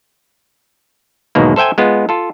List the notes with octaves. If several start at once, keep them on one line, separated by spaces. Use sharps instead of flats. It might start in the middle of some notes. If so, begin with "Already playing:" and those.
B1 E2 G#2 B2 D#3 A#3
A4 C5 E5 G5 G#5
G#3 B3 F4
F4 A4